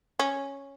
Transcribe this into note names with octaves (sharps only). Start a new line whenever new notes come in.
C#4